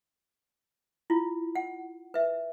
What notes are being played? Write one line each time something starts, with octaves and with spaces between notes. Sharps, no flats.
E4 F4
F#5
B4 E5